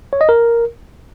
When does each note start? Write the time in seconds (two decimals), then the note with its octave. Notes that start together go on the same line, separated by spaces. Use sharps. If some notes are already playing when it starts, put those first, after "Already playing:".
0.13 C#5
0.21 D#5
0.29 A#4